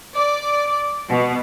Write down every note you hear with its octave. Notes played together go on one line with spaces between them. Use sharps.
D5
B2